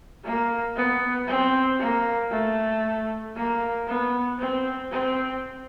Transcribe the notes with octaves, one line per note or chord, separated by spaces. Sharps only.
A#3
B3
C4
A#3
A3
A#3
B3
C4
C4